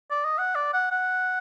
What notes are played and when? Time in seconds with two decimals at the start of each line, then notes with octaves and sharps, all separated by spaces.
0.11 D5
0.25 D#5
0.38 F#5
0.55 D5
0.74 F#5
0.92 F#5